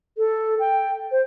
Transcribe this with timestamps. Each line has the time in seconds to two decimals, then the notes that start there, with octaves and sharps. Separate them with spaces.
0.18 A4
0.60 G5
1.11 C5